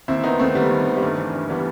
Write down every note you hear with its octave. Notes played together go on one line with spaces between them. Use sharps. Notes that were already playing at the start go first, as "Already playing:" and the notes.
D#2 C4 E4
D#3 B3 D#4
D#2 A3 C4
D#3 G3 B3
D#2
D#3
G3
G2 A3
E3
G2
E3 G3 B3